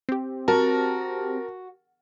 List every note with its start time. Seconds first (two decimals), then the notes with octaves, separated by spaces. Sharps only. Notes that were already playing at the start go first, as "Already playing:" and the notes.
0.09 C4 G4
0.48 F#4 A#4 A5